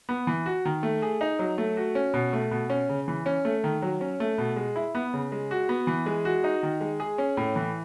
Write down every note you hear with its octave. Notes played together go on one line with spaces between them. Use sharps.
B3
E3
F#4
D#3
A3
G#4
D#4
F#3
A3
F#4
C#4
B2
A3
B2
C#4
C#3
E3
C#4
A3
D#3
F#3
C#4
A3
B2
G#3
E4
B3
C#3
G#3
F#4
B3
E3
G#3
F#4
D#4
D#3
G#3
G#4
C#4
A2
E3